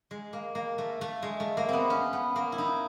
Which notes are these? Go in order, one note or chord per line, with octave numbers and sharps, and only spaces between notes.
G#3
A#3
A#3
A3
A3
G#3
A3
A#3
B3 C4
C#4
B3
A#3
E4
D#4